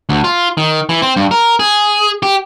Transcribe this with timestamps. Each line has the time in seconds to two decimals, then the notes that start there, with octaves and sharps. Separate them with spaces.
0.09 D2
0.24 F4
0.57 D#3
0.89 E3
1.02 C4
1.17 G2
1.31 A#4
1.59 G#4
2.23 G4